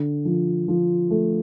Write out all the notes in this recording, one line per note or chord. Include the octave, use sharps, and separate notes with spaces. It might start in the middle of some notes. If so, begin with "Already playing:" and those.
Already playing: D3
F3
F3
A3